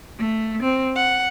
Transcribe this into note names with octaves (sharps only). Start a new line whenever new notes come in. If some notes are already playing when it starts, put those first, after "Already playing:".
A3
C4
F#5